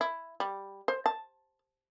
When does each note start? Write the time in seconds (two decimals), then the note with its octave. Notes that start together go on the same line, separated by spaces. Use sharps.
0.01 E4
0.40 G3
0.88 C5
1.06 A5